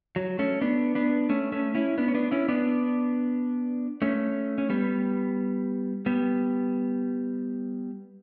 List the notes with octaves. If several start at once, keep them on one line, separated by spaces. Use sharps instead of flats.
F#3
A3 C#4
B3 D4
B3 D4
A3 C#4
A3 C#4
C#4 E4
B3 D4
C#4
B3 D4
C#4 E4
B3 D4
A3 C#4
C#4
G3 B3
G3 B3